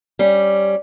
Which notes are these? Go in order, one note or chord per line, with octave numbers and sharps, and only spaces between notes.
G3 C#4